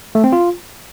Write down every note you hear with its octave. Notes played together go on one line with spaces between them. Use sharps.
A3
C4
F4